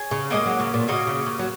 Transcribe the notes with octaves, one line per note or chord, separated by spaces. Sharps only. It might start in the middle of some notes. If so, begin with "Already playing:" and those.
Already playing: G#4 C#5 G#5
C#3
G#3 A#3 C#4 F#4 D#5
F#3
C#3
A#2
C#3 A#3 C#4 F#4 D#5
C#3
C#3
F#3